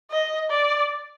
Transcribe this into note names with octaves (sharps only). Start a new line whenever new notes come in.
D#5
D5